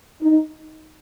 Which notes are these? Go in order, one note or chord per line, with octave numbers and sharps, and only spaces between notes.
D#4